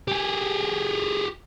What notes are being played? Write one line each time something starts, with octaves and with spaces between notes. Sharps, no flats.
G4 G#4